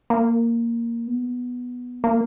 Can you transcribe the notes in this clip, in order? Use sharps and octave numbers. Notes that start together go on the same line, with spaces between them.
A#3
B3
A#3